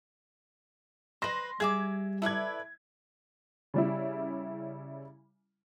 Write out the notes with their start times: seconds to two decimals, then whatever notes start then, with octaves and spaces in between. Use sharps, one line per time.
1.22 B4 C5 C6 A#6
1.60 G3 G#4 E5 D6 G#6
2.22 E4 A4 B4 D5 G#6
3.74 C#3 G3 E4